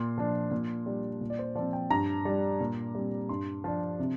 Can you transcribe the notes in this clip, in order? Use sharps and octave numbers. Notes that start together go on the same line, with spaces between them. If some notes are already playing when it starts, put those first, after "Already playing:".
Already playing: A#2 C6
F3 D4
A#2
G3 D4
A#2
D5
C5
F3 C4 D5
G5
G2 A#5
G3 D4
A#2
G3 C4
G2 C6
F3 D4
C3